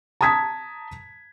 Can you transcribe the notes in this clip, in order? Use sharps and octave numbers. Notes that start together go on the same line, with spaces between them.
A5 A#5 D#6 G#6 B6